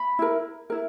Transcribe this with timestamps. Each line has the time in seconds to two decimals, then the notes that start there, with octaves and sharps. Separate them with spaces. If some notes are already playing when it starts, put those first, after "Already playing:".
Already playing: B5
0.19 E4 A#4
0.70 E4 A#4